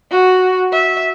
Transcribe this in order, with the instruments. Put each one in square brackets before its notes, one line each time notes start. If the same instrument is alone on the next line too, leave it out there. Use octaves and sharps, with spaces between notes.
[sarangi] F#4
E5